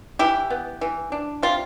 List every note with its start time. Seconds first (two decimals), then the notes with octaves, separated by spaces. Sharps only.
0.19 E3 E4 G4
0.50 B3
0.81 E3
1.12 D4
1.43 C3 F4